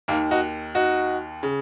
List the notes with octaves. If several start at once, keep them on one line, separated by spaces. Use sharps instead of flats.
D#2 D#3 A#3
D#4 F#4
D#4 F#4
C#3